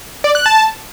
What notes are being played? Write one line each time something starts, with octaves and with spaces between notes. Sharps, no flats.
D5
F#6
A5